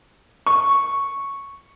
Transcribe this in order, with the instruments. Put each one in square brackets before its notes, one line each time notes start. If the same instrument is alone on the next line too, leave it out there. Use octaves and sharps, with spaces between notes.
[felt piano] C#6